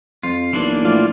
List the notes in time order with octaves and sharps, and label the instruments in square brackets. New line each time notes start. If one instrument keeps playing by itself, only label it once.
[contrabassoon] F2 [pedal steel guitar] F4
[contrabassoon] B1 [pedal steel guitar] E3 A#3 D4
[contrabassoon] A2 [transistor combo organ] F3 F4 D5